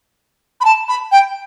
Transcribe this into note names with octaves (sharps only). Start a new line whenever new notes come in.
B5
A5
B5
G5